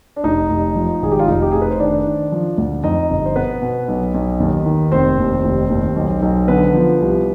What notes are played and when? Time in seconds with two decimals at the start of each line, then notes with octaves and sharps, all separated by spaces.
0.16 D4
0.23 F1 D#4
0.50 F1
0.75 F3
1.02 G#1 G#4
1.12 G4
1.19 F4
1.27 F1 D#4
1.42 G4
1.52 F1 G#4
1.62 B4
1.71 C5
1.80 D#3 D4 D5
2.06 D#3
2.32 F3
2.58 D2
2.83 F2 D#4 D#5
3.10 G1
3.26 C5
3.36 B2 B3 B4
3.62 B2
3.88 B1
4.14 B1
4.40 D#2
4.65 D#3
4.92 F1 C4 C5
5.18 D#2
5.44 F1
5.70 D#2
5.96 B1
6.22 B1
6.48 D3 B3 B4
6.74 F3
7.00 C2